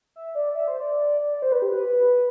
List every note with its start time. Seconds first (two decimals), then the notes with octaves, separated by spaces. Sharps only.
0.16 E5
0.35 D5
0.55 E5
0.68 C5
0.80 D5
1.33 D5
1.42 C5
1.52 B4
1.62 G4
1.72 B4